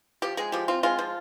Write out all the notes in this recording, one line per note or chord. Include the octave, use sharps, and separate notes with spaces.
F3 G4
G#3 G#4
F3 G4
C4 F4
G#3 F4
F3